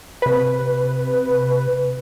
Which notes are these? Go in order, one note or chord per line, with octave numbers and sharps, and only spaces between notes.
C3 B4